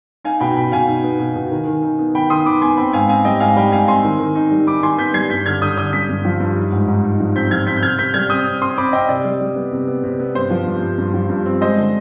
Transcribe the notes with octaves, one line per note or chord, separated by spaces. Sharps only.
D#4 F5 G#5
B2 G5 B5
B2 G5 B5
B2 F5 G#5
D#4
B3
B2
B2
D#3
D#3
D#4
B3
D#3 G5 B5
D#3 C6 D#6
B3 B5 D6
B3 G#5 C6
C4 G5 B5
G#2 F5 G#5
C4 F5 G#5
G3 D#5 G5
G#2 F5 G#5
G3 G5 B5
G#2 F5 G#5
C4 G#5 C6
D#3
D#3
D#4
G3
D#3 B5 D6
D#3 G#5 C6
B3 G6 B6
G3 G#6 C7
G2 G6 B6
D3 F6 G#6
D3 D#6 G6
D3 D#6 G6
G2 G6 B6
G2
F3
G2
D#4
G#2
G#2
D#4
F3
C4 G6 B6
F3 F6 G#6
C4 G6 B6
G6
C3 F6 G#6
C3 G6 B6
G3 F6 G#6
C4 D#6 G6
C4
C4 C6 D#6
C4 B5 D6
C4 D#5 G5
C3 D5
G3
G3
B3
C3
B3
C3
B3
G2 C5
F3
G2
G2
G2
F3
G2
C4
G#3 C5 D#5
D3